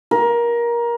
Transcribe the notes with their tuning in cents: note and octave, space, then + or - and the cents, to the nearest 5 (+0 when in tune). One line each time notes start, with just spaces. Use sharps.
A#4 +20